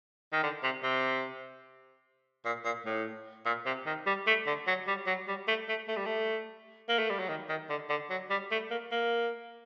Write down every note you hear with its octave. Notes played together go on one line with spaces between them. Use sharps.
D#3
D3
C3
C3
A#2
A#2
A2
A#2
C3
D#3
G3
A3
D3
F#3
G3
F#3
G3
A3
A3
A3
G3
A3
A#3
A3
G3
F#3
D#3
D#3
D3
D3
F#3
G3
A3
A#3
A#3